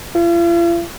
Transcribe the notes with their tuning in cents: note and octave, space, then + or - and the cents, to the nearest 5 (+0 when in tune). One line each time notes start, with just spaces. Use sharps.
F4 -45